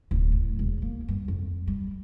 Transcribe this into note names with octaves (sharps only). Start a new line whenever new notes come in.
D1
A2
E1
A#3
G2
F2
G3